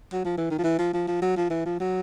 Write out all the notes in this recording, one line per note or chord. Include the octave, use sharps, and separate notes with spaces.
F#3
F3
E3
D#3
F3
E3
F3
F3
F3
F#3
F3
E3
F3
F#3